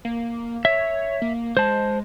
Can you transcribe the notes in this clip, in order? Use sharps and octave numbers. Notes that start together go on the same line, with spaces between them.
A#3
C#5 E5
A#3
G#3 C5 A5